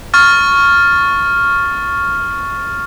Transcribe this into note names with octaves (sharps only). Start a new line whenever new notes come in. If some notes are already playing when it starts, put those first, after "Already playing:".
C#6 F6 A6